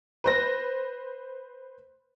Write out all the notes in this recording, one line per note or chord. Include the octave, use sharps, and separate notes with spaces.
B4 C5 A#6